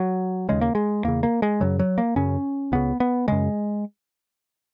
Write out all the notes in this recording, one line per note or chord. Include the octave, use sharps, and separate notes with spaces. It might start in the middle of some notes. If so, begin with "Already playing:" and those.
Already playing: F#3
D#2 C#3 G#3
A#3
G#3
E2 C#3 A#3
A#3
G#3
F#2 C#3 F#3
F#3
A#3
F#2 C#3 C#4
C#2 C#3 B3
B3
F#2 C#3 G#3